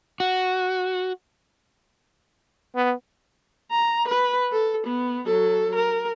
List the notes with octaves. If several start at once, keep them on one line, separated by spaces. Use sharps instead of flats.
F#4
B3
A#5
B4
A4
B3
F#3 A4
A#4